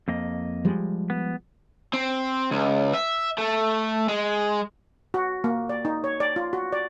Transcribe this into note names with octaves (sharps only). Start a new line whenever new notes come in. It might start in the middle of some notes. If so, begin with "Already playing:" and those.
F2 A#3 D#5
F3 G3 G#3
B3
C4
C#2
E5
A3
G#3
F#4
A#3
D5
D#4
C#5
D5
F4
F#4
D5